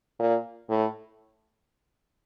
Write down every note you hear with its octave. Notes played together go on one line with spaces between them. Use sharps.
A#2
A2